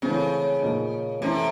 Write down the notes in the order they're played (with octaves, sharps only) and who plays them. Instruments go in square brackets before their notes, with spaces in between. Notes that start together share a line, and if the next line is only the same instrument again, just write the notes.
[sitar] C#3 [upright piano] E3 A3 C4
[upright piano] A#2 F3 A#3 D#4
[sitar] C3 [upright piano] E3 A3 C#4 E4 A4